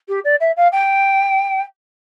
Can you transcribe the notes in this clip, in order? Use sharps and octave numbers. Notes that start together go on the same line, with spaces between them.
G4
D5
E5
F5
G5